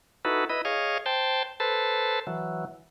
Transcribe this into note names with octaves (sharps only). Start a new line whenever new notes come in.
D#4 E4 F#4 A4 B4
E4 B4 D#5
G#4 C#5 D#5 F5
C5 G5 A5
A4 B4 C5 A5
E3 F#3